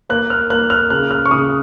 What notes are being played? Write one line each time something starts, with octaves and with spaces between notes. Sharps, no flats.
A#3 F#6
F6
A#3 F#6
F6
C#3 F#6
F6
C#6
C#3 D#6